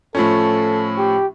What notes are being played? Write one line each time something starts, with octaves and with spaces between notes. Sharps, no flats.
A2 F3 C#4 A4
G4